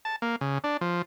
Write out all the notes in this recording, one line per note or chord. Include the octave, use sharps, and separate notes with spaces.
A5
A#3
C#3
D4
F3